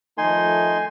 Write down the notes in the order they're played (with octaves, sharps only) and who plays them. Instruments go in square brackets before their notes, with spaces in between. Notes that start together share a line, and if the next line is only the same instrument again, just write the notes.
[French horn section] D#3 F3 A3 [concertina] D#4 C6 [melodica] G#5